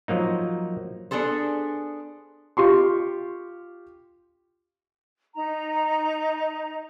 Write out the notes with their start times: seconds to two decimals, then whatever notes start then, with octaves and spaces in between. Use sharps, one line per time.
0.08 F3 F#3 A#3 D#4
1.11 B3 D4 G#4 A4 C5
2.57 F4 G4 C6 C#6
5.35 D#4 A#5